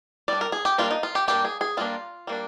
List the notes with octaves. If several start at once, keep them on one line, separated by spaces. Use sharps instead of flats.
G3 D4 D5
A#4
G#4
G4
G3 A#3 D4 F4
D#4
F4
G4
G3 A#3 D4 G4
G#4
G#4
G3 A#3 D4 F4
G3 A#3 D4